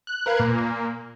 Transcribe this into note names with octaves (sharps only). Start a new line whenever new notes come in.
F#6
A#4 B4 F5 F#6 G#6
A#2 A#3